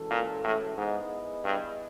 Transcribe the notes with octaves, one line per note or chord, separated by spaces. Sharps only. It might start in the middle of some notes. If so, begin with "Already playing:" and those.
Already playing: E3 G#3 C#4 F#4 A4
A#2
A2
G#2 B3 E4 G#4 B4 D#5
G2